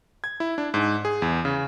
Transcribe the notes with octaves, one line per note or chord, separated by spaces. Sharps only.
G#6
E4
D4
G#2
G#4
E2
C#3